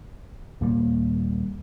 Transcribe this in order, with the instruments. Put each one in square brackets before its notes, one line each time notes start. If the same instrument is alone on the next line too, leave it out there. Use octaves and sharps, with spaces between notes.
[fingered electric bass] D#2 A#2 G3 A#3